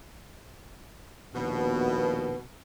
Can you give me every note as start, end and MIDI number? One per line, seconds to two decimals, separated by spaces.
1.34 2.36 34
1.34 2.36 39
1.34 2.40 47
1.34 2.36 59